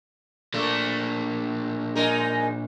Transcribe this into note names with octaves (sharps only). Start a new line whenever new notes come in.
A#2 A3 A#3 D4
G#3 D#4 A#4